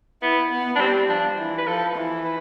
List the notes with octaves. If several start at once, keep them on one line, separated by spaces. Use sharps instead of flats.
B3 E4
B3
D4
G3 C4
F3 D4
E3
B4
F3 A4
E3
B4